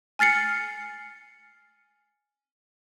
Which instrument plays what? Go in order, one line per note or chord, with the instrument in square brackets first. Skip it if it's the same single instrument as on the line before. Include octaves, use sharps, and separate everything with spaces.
[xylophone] G#5 F6 A6 C7 C#7